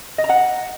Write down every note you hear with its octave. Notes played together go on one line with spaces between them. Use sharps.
D#5
A#5
F#5